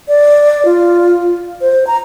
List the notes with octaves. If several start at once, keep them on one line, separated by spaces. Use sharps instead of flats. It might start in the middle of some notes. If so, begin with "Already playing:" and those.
D5
F4
C5
A#5